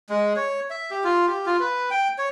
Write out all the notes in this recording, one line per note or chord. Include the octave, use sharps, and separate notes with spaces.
G#3
C#5
E5
G4
F4
G4
F4
B4
G5
C#5